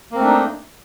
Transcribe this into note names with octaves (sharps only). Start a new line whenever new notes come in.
A3 A#3 C4 D4 D#4